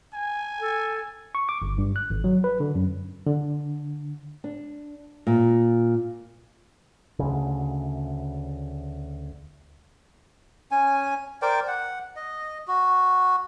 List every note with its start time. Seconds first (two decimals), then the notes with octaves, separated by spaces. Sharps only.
0.14 G#5
0.60 A4
1.35 C#6
1.49 D6
1.62 G1
1.78 G2
1.96 F#6
2.10 G#1
2.24 F#3
2.44 B4
2.60 D3
2.75 F#2
3.26 D3
4.44 D4
5.27 A#2
7.19 D2 C#3
10.71 C#4 G#5
11.42 A#4 C5 D5 G5
11.67 F#5
12.16 D#5
12.68 F#4